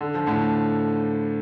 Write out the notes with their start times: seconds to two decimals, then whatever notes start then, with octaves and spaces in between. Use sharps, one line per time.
0.01 D3
0.15 F3
0.27 A2 D3